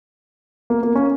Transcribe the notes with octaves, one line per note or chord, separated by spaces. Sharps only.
A#3
A#3
C#4